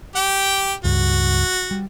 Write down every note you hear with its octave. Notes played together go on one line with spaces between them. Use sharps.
G4 G5
C#2 G2 F#4
G3